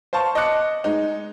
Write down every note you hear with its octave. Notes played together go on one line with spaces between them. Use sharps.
C5 F5 A5 C#6
D#5 A5 D6 F#6 C#7
G#3 D#4